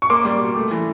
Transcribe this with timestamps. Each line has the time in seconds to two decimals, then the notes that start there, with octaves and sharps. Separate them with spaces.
0.02 C#6
0.10 A#3 C6 D6
0.25 G3
0.41 B2
0.56 A3
0.71 E3